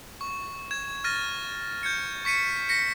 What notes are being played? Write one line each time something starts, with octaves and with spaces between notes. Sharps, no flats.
C#6
G#6 E7
F6 A6 A#6 D#7
G6 G#6 C#7
C#6 B6 C#7 D#7
A#6 B6 C#7